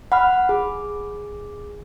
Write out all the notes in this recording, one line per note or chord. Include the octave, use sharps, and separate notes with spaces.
F#5 B5 F6
G#4